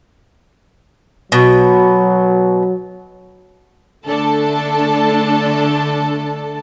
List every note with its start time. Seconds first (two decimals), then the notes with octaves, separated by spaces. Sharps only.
1.32 B2 F#3
4.07 D3 A3 D4 A4 A5